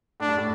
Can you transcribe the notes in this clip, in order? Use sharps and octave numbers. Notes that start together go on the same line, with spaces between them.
A2 D4
G2
A2